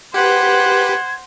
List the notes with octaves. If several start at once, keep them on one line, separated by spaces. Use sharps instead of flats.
G4 B4 C5 F#5 G#6